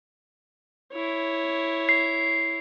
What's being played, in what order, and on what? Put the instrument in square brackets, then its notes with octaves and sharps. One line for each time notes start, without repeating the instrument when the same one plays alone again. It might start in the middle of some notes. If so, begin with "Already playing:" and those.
[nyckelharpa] E4 C#5
[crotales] C7